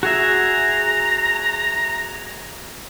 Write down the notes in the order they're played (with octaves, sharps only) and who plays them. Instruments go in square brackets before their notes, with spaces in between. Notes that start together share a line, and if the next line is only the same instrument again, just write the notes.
[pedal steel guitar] F#4 G#4 E5 [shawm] A#5